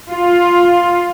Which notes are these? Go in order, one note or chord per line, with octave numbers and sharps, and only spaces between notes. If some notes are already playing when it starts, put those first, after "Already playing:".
F4